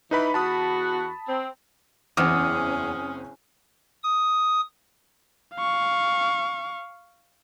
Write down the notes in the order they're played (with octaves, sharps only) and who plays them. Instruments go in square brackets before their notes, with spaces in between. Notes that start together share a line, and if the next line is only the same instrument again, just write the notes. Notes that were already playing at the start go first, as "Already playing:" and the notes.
[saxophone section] E3 [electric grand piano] D#4 B4 B5
[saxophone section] E2 F#4 [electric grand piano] A5 B5 D#6
[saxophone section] C4
[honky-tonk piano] F#1 C4 [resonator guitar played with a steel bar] E2 [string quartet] C#4 G#4 [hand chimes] D#6 F6 C#7
[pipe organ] D#6
[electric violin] F5 C#6